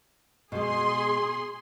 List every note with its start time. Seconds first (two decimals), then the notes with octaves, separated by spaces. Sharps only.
0.52 B2 G#3 G#4 C6